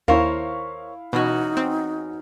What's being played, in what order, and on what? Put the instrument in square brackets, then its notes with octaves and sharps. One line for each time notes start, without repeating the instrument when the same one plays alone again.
[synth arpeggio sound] D#2 [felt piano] E4 F5 [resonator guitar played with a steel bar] A#4 C5 C#5
[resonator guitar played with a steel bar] E2 C#4 F#4 [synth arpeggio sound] B2 [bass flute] D#4
[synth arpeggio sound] C4